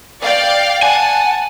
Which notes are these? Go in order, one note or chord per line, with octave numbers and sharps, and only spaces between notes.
D5 F5 G5
F#5 G#5 A5